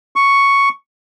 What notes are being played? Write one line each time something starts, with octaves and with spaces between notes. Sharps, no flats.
C#6